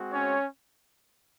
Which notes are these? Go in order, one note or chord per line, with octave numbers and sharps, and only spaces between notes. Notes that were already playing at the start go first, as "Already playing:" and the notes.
Already playing: G#3 C4 F#4
C#4 C#5